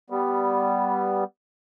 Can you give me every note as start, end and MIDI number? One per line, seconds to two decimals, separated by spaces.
0.10 1.24 55
0.10 1.24 59